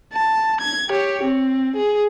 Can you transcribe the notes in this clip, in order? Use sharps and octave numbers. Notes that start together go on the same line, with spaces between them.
A5
G#6
G4 C#5
C4
G#4